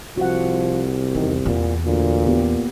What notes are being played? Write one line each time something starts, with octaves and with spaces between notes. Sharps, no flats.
C2 F3 F#4 F#5
E2 D#3
E2 A#2
D2 A#2
A#3 B3 G4